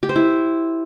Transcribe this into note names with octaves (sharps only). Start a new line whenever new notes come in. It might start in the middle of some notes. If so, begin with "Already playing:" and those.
G4
C5
E4